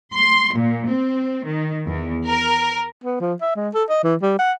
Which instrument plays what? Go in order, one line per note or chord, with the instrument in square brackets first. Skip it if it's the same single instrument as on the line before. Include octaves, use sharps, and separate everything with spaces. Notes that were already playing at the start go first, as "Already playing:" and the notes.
[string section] C6
A#2
C4
D#3
E2
A#4
[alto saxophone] B3
F3
E5
G#3
A4
D#5
E3
G3
F#5